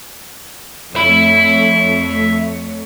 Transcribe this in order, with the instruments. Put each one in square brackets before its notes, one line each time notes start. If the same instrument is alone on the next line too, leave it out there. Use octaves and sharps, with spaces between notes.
[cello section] F2 A3 C#5 [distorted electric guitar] E5 B5